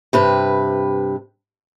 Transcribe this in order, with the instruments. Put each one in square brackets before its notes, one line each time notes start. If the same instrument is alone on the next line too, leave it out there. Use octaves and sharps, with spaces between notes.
[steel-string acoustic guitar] G2 C3 B4